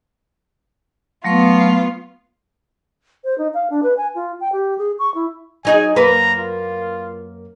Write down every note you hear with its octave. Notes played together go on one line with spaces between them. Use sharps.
F#3 A3 B3 F4 C#6
C5
D#4
F5
D4
B4
G#5
F4
G5
G4
G#4
C#6
E4
F#3 D#4 G#4 G#5
F#2 A#3 B4 A#5
F4